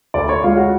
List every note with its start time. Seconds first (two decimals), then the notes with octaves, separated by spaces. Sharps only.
0.14 D2 D5
0.29 C#5
0.44 G#3 F4
0.57 F#4